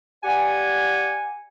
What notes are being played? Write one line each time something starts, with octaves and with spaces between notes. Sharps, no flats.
G4 D5 F#5 G#5